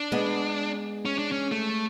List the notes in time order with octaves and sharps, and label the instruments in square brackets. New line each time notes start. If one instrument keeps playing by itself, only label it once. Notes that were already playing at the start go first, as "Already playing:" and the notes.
Already playing: [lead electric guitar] D4
[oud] G#3 B3
[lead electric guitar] C#4
D4
C#4
A3